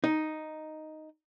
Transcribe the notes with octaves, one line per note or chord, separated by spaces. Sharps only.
D#4